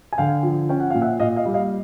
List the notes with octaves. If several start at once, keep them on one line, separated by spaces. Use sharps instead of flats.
G#5
D3 F5 G5
F3
C#4 G5
F#5
A#2 F5
E5 F#5
A#2 D#5 F5
D#5 F5
G3
D#5 F5